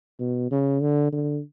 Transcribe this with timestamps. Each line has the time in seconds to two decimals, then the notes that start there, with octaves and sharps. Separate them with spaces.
0.20 B2
0.51 C#3
0.82 D3
1.13 D3